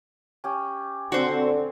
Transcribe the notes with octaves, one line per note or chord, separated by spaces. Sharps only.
C#4 G4
D3 C4 F#4 C5